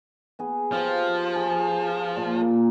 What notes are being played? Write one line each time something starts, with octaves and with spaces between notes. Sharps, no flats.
B3 G#4
F3 F4 G4 C6
G#4 B4
A#2
A#3